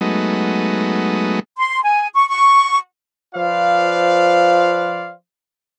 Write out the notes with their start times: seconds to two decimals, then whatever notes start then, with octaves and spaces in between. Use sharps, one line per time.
0.01 F#3 G#3 A3 B3 D#4
1.57 C6
1.83 G#5
2.15 C#6
2.28 C#6
3.35 F3 F4 B4 C5 D5 F5